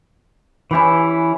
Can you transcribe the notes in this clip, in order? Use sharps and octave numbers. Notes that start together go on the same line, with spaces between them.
E3 C#4 E4 G4 B4